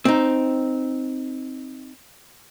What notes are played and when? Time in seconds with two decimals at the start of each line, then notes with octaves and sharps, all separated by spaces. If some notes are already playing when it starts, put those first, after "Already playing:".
0.05 C4 D#4